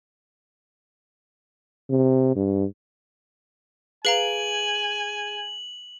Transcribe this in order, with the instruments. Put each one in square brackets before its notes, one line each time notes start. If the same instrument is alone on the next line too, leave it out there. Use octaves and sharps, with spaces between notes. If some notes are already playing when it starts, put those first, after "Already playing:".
[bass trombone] C3
G2
[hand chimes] G#4 D7 [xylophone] B4 F5 A#5 [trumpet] G#5 [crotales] F#7